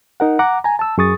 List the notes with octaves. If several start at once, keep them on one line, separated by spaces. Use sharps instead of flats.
D#4 A#4 F#5
F#5 A#5 D6
G#5 A#5
A5 E6
F#2 G#4 C#6 D#6 A6